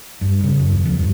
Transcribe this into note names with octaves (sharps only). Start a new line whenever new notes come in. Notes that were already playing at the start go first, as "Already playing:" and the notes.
G2
C#3
F#2
D#2
F2
G2